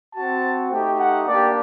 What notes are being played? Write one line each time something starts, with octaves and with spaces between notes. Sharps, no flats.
C4 F#4 A5
A3 D#4 G4 G5
F#5
A#3 D4 G4 D5